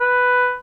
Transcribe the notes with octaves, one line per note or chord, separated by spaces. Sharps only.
B4